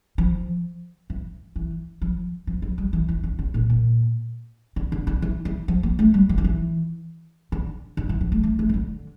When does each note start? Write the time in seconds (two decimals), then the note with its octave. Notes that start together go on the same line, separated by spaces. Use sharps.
0.18 F3
1.10 E3
1.56 E3
2.02 F3
2.47 F3
2.62 F3
2.78 G3
2.93 E3
3.09 E3
3.24 D3
3.39 C#3
3.54 A#2
3.70 A#2
4.76 D3
4.92 D3
5.07 D3
5.22 E3
5.45 E3
5.68 F3
5.83 A#3
5.99 A3
6.14 G3
6.29 E3
6.38 F3
6.44 E3
7.52 D3
7.97 D3
8.09 E3
8.21 F3
8.32 A3
8.43 A3
8.59 A3
8.69 E3
8.74 D3